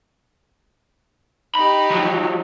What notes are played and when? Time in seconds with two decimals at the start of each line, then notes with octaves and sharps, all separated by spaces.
1.55 D#4 G4 B5
1.91 F3 F#3